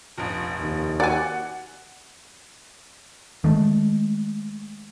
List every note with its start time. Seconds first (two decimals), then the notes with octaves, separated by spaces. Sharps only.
0.18 F1 A#1
0.60 D#2
1.00 F#4 D5 F#5 G#5
3.44 D#3 G#3 A3